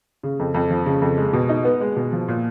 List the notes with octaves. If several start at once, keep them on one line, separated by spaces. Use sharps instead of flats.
C#3
F2
F2
F3
C#3
F2
G#3
B2
D#4
B3
G#3
B2
F3
A#2